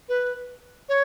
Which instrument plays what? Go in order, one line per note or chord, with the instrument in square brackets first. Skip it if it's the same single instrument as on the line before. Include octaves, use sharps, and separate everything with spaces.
[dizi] B4
C#5